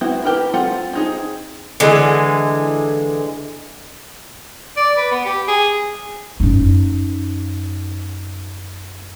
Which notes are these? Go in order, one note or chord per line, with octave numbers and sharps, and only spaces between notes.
B3 C4 E4 F#4
E4 G4 A#4 B4
C4 F4 A4 F#5
C4 D#4 G#4
D3 E3 G#3
D5
B4
B3
G4
G#4
F#2 D#4